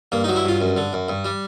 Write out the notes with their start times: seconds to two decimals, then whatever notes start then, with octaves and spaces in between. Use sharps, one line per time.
0.12 G2 A#3
0.24 D#4
0.28 F#3
0.36 E4
0.45 G2 F4
0.61 F#2
0.77 D3
0.93 F#2
1.09 G2
1.25 G3